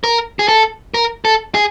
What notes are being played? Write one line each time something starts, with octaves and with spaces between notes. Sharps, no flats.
A#4
G#4
A4
A#4
A4
G#4